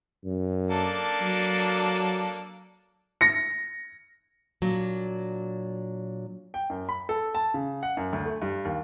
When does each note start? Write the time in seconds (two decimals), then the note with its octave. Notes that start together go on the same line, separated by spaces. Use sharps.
0.25 F#2
0.71 A#3 D4 A4
1.22 F#3
3.21 A#6 C#7
4.62 A#2 F#3 D4
6.54 G5
6.70 F#2
6.89 B5
7.09 A4
7.35 A5
7.54 C#3
7.83 F#5
7.97 F#2
8.13 D2
8.25 A3
8.42 G2
8.65 D#2